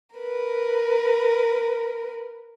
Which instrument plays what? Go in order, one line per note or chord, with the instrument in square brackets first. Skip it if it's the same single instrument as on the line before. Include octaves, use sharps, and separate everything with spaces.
[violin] A#4 B4